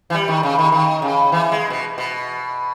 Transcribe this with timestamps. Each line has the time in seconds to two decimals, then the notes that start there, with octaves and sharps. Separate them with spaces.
0.10 E3
0.14 G3
0.28 D#3
0.43 C#3
0.59 D#3
0.72 D#3
1.02 C#3
1.32 E3
1.52 G#3
1.70 B2
1.98 B2